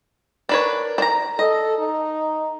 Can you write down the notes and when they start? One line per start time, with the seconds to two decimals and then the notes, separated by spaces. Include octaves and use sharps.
0.49 D4 A#4 B4 C#5
0.98 D4 A#5
1.39 A4 D#5
1.79 D#4